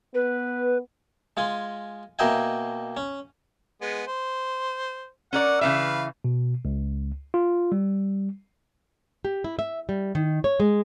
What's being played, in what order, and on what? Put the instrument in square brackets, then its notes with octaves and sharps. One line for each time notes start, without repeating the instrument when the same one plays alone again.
[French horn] B3 [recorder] B4
[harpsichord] G#3 F4 G#5
B2 A#3 D#5 E5 G5 G#5
C#4
[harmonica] G#3 B3
C5
[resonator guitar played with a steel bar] C#4 A#4 D5 [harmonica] F#5
[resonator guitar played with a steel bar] C#3 E3 E5 [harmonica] B4 F5
[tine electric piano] B2
C#2
F4
G3
[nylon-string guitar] G4
E4
E5
G3
D#3
C#5
G#3